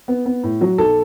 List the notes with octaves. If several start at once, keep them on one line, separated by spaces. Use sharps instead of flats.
B3
B3
A2
F#3
B1 A4